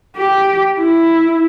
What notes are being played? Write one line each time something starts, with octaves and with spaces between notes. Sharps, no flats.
G4
E4